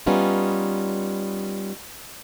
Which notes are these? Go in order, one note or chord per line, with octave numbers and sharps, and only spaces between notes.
G3 B3 C#4 D#4 F4